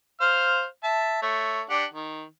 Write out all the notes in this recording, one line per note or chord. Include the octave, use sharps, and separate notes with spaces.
C5 F5 F6
E5 A5
A3 C#5
D4 G4 F#5
D#3